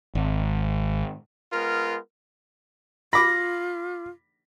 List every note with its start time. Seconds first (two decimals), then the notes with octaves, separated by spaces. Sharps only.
0.15 G#1
1.53 G#3 B3 F4 A#4
3.13 F4 B5 D6 A#6